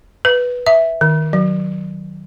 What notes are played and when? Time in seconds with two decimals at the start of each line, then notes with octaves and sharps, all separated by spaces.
0.25 B4
0.66 E5
1.01 D#3
1.33 F#3